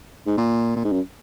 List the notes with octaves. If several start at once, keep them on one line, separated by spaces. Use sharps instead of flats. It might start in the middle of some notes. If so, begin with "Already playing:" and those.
G#2
A#2
A#2
G#2
F#2